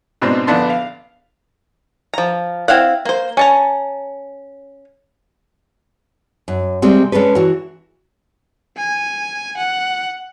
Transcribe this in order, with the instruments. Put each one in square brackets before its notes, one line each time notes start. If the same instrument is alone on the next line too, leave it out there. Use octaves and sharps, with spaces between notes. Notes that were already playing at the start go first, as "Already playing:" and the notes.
[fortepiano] G#2 B2 G#3 C4 D4
A#1 D3 B3 D4 A5 C6
F5
[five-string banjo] F3 A#5
C4 E4 F5 F#5
A#3 C5
C#4 A5 A#5
[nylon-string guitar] F#2
C3 G3 G#3 C4
G#3 C#4 D4 A4 B4
E3 F#4
[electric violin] G#5
F#5